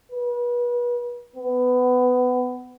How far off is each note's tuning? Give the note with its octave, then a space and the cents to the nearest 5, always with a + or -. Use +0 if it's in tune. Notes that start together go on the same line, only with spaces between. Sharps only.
B4 -35
B3 +20